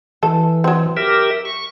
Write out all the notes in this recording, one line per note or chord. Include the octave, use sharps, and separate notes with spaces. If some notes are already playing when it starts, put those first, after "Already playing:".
E3 A4
F#3 C4
G4 A#4 E5
C#6